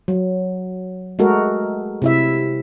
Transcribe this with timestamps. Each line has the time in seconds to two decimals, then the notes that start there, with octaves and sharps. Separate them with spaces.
0.08 F#3
1.19 G#3 A3 F#4 A4 A#4
2.02 C3 E4 E5